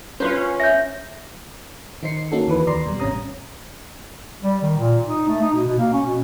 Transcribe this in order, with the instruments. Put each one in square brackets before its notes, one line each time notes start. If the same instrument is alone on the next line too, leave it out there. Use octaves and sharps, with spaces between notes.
[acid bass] C#4 [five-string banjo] F4 B4 C5
[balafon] E5 [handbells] G6 A#6
[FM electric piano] D#3 D#4 C5 C7 C#7
A#3 C#4 D#4 F#4 A4
D#2 E3 B4
D#2 D5 A#5 C6 C7
B2 G3
G#1 A2 C3 C#4 A#5 D#6
[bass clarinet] G3
D#3
A#2
D#4
A3
D#4
B2
B2
A#3
C#4
B2